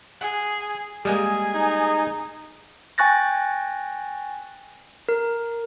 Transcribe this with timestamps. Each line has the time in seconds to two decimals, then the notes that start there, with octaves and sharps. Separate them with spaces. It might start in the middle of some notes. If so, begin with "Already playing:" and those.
0.21 G#4 F#5
1.05 G3 G#3 A#3 G#4 G#5
1.55 D#4
2.98 G5 G#5 C#6 F#6 A6 A#6
5.09 A#4